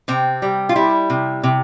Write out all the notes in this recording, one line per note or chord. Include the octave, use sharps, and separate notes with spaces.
C3 C4
G3
F4
G3 E4
C3
C3